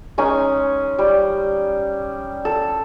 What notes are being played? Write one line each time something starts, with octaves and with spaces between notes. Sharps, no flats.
G#3 C#4 D#4 G#5
G3
A4